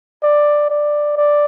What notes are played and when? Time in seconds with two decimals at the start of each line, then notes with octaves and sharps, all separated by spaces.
0.23 D5
0.70 D5
1.17 D5